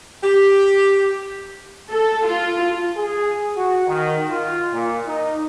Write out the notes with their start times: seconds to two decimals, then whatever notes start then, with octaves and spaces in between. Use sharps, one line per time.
0.23 G4
1.90 A4
2.26 F4
2.97 G#4
3.57 F#4
3.87 D#3
4.30 F4
4.73 A#2
5.07 D#4